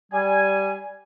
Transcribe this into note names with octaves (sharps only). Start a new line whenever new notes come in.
G3 G#5